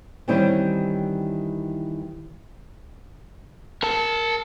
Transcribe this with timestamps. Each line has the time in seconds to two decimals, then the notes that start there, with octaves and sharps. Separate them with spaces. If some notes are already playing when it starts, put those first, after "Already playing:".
0.28 D#3 E3 G3 C4 C#4 E4
3.83 A#4 A5